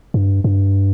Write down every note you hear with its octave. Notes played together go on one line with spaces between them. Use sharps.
G2
G2